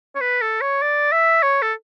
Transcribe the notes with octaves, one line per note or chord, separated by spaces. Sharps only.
C#5
B4
A4
C#5
D5
E5
C#5
A4